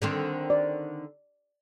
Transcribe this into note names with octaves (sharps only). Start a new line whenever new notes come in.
D3 D#3 C4
D5